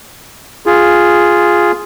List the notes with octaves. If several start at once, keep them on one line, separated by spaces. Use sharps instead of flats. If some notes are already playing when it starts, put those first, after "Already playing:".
F4 G#4